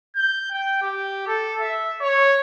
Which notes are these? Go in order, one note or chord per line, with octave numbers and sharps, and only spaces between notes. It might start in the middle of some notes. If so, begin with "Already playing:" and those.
G6
G5
G4
A4
E5
C#5